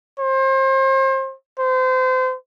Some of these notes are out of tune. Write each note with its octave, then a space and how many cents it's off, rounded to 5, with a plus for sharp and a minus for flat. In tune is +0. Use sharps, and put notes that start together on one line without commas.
C5 +35
C5 -30